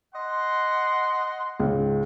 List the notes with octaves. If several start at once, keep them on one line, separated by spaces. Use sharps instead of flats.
D#5 F#5 C6
C#2 G#2